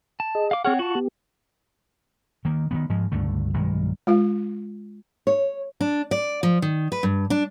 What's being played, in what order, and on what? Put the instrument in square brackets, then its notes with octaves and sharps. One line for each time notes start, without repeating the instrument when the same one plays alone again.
[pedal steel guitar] A5
[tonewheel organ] G#4 D#5
[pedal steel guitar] F5 D6
[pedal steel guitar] C4 C#5 F#5 [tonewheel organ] G#4 C#6 F6
[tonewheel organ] F4 C#6 [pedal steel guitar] F#4 A5
[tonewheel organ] B3 G4
[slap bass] D#3 A#3
D#3 E3 B3
G#2 F3 G#3
C#2 G2 D3 A3
B1 G2 D#3 G#3
[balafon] G#3 F4 F5
[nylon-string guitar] C#5
[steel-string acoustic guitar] D4
D5
F3
D#3
B4
G2
D4